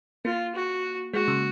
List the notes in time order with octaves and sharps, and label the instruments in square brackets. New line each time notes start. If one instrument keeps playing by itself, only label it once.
[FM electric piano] A#3 [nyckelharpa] F4
[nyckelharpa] F#4
[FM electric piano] G#3 [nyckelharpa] F#4
[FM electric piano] C#3